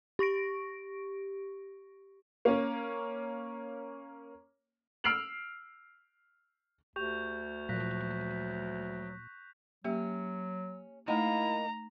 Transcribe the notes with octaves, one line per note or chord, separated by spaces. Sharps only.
G4 C#6 A#6 D7
A#3 C#4
E6 F6 C7 D7 F7 F#7
D2 G4 C#6 G6 F7
A#2 F3 F#3 F#6 A#6 B6
F#3 A#3 C#4 G4 E5
A3 A#3 D#4 E4 D#5 G5 A#5